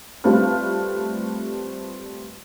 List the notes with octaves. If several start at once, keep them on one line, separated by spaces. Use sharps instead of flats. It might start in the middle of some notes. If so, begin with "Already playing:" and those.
G3 A3 C4 F4 B4 F6